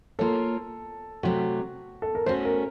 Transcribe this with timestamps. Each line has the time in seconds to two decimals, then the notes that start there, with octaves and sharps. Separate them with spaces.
0.19 A#3 F4 A4 A#4 C#5
1.23 C3 F#3 A3 F#4
2.02 A4
2.15 A#4
2.26 A3 C#4 F#4 C5
2.45 A#4